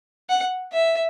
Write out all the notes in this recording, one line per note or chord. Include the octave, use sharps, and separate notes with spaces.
F#5
E5